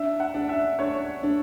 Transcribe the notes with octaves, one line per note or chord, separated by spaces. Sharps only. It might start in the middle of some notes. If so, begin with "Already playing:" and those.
Already playing: D4 E5
F#5
D4
E5
D4 C#5
D4